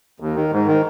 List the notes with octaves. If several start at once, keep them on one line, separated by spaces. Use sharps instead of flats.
D#2
D#3
G#2
D#3